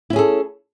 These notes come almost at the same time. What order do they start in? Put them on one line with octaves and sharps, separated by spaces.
E4 C#4 G#4 A4